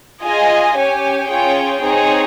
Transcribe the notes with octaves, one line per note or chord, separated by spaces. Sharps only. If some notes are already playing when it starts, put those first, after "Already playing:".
F4 G#4 D#5 G#5
C#4 G4 C#5 G#5
C#4 F4 G#4 C#5 G5
C4 D#4 G#4 C#5